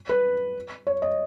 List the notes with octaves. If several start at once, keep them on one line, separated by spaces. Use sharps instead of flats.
B4
C#5
D#5